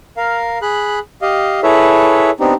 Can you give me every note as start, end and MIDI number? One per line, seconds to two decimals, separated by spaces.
0.17 0.58 70
0.17 0.58 77
0.62 0.99 68
0.62 0.99 83
0.62 0.99 90
1.22 1.60 67
1.22 1.60 75
1.22 1.60 77
1.63 2.30 64
1.63 2.30 68
1.63 2.30 69
1.63 2.30 71
1.63 2.30 73
1.63 2.30 76
2.40 2.54 59
2.40 2.54 60
2.40 2.54 62
2.40 2.54 63
2.40 2.54 67